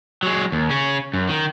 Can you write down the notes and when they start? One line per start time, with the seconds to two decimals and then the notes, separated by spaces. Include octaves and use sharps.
0.23 F#3 G#3
0.52 D#2
0.70 C#3 C#4
1.14 F#2
1.29 D#3